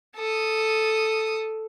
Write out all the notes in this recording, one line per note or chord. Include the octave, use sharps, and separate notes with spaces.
A4 D#6